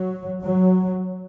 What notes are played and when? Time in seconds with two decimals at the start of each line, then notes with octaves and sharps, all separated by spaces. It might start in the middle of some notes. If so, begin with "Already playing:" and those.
Already playing: F#3
0.44 F#3